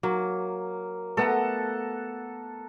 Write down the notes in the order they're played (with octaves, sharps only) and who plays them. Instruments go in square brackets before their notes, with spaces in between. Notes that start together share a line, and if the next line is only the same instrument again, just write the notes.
[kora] F#3 [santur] A#3
[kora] A3 B3 [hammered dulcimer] A4 F#5 A#5